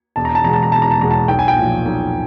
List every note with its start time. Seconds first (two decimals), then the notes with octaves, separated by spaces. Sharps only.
0.16 E1 A5
0.25 A#5
0.35 A5
0.44 E2 B2 G#3 A#5
0.53 A5
0.63 A#5
0.72 E1 A5
0.82 A#5
0.91 A5
1.00 E2 B2 G#3 A#5
1.11 A5
1.28 B1 G5
1.39 G#5
1.48 G5
1.56 A#2
1.62 F3
1.85 B1